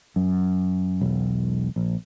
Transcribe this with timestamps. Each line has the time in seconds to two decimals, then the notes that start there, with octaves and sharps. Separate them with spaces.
0.16 F#2
1.01 E1 B1
1.76 A#1